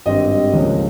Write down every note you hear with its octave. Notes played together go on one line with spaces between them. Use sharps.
G#1 G2 G3 C4 D#5
C#2 C#3 F3 A#3 C#4